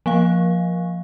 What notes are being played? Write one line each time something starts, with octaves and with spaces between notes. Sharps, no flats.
F3 A#3 F5